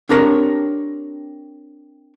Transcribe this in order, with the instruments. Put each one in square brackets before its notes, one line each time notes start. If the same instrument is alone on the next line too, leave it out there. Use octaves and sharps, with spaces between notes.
[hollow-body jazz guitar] C4 D4 G4 A#4 C#5